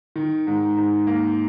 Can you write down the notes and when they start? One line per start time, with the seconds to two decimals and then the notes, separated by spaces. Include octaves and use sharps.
0.16 D#3
0.47 G#2
0.77 G#2
1.07 A#3